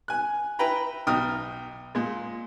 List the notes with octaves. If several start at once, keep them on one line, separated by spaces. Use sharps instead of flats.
G#5 F#6
E4 B4 G5 A#5 B5
B1 D#4 G5 D#6 F6
A#2 G#3